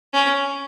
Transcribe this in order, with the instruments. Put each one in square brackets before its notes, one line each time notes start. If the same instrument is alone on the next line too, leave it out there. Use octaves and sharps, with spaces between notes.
[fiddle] C#4